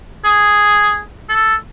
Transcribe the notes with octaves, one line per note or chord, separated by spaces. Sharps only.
G#4
A4